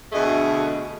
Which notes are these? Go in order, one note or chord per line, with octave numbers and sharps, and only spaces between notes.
D2 B2 A3 G#4 D#5